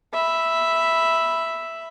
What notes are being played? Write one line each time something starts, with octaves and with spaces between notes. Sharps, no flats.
E5 B5